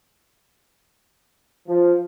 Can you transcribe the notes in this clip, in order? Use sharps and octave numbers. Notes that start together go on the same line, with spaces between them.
F3